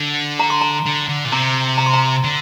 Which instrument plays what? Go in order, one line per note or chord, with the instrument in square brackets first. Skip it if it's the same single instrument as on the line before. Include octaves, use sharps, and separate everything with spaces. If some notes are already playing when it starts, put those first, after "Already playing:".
Already playing: [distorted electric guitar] D3
[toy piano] A#5
C6
A#5
[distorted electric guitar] D3
D3
A#2
[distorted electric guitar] C3 [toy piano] A#5
[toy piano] A#5
C6
A#5
[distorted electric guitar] D3